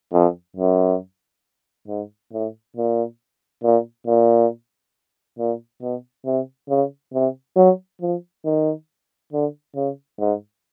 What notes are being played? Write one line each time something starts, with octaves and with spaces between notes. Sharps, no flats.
F2
F#2
G#2
A2
A#2
A#2
A#2
A#2
B2
C3
C#3
C3
F#3
F3
D#3
D3
C#3
G#2